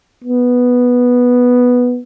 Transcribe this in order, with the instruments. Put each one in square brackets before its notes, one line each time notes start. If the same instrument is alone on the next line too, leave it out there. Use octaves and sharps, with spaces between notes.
[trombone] B3